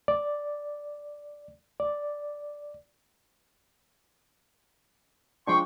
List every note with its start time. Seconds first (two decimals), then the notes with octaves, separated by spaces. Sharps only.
0.08 D5
1.80 D5
5.47 F3 G#3 D4 G5 C6 C#6